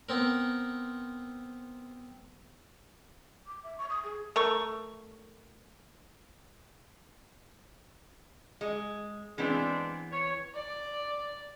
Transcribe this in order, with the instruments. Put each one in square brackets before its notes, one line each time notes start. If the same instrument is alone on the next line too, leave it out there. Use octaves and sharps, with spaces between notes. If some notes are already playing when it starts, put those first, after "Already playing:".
[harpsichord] B3 C4 A#4
[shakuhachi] D6
E5
C#6
D#6
G#4
[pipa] A3 A#4 C#6
[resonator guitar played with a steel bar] G#3
[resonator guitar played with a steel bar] E3 B3 C4 [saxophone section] G#3 D4
[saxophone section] C#5
[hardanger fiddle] D5